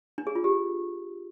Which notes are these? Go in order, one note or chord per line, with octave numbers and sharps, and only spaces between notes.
D4
G#4
F4
G4